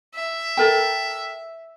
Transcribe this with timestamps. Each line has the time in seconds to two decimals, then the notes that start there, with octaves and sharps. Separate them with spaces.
0.15 E5
0.57 A4 A#4 G5